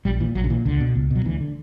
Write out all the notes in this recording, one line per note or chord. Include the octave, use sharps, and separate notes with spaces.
A#1 G3
A#2 E3
A#1 F#3
D3
A#2 E3
C#2 D3
B2
C#2
B2
F#3
D2 E3
D3